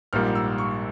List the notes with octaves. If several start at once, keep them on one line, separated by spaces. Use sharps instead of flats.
A#1 G#2 G3 A#3 F6
E6
C#6